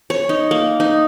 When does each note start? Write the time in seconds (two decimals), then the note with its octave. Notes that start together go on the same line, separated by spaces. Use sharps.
0.10 C#5
0.29 D#4
0.51 A#3
0.80 D#4